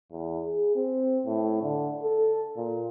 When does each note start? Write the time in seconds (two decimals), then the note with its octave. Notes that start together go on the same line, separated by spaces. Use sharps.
0.11 E2
0.45 G#4
0.76 C4
1.26 A2
1.62 D3
2.02 A4
2.56 A#2